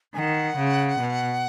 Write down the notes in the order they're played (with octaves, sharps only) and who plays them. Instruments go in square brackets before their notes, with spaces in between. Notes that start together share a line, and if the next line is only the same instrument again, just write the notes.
[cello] D#3 [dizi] F#5 G#5
[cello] C#3
B2